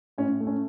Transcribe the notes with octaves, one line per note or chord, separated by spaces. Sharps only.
A2 C#4
A3
C#4